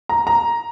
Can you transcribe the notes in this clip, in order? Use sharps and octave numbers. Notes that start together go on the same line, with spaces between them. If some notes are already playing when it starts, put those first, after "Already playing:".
A#5
A#5